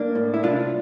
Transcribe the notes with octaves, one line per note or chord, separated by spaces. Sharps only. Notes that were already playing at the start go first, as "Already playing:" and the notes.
Already playing: A#3 D4
A2
E4
C2 D4 F4